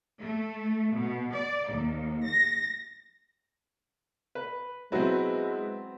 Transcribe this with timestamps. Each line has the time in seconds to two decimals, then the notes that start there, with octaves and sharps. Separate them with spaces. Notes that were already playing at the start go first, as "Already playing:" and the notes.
0.20 A3
0.96 B2
1.34 D5
1.68 D#2
2.26 A#6
4.35 B4
4.92 F#3 G#3 B3 C4 E4 F#4 B4